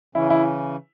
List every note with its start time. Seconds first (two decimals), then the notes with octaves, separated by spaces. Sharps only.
0.15 C#3 E3 C#4 E4
0.30 E4